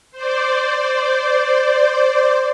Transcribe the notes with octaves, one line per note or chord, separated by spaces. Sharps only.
C5 D5